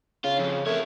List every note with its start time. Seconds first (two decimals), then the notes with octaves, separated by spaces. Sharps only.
0.24 C#3 F4
0.39 F2
0.66 A3 A#4 C#5